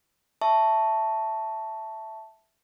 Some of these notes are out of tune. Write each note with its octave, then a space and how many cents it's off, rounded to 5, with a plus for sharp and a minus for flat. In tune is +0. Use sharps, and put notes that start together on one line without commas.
E5 +0 A5 +0 C#6 +0